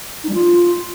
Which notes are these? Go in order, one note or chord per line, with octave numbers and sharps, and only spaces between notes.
D#4
G3
F4